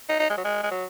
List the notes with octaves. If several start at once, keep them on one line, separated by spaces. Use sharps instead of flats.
D#4
D#4
G#3
F#3
G#3
G#3
F#3